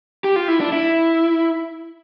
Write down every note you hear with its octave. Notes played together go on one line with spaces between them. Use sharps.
G4
F4
E4
D4
E4